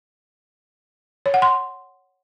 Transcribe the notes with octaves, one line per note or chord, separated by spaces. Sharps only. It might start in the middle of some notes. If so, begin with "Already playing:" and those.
C#5
F#5
C6